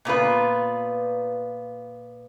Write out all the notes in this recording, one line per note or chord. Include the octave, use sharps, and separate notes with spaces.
A#2 B3 F4 B4